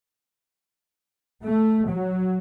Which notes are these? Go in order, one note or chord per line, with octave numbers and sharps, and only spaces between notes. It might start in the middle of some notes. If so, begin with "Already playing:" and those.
A3
F#3